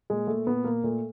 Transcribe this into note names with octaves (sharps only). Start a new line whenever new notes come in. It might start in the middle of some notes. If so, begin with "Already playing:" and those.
A#2 G#3
A#2 A3
A#2 B3
A#2 A#3
A#2 A3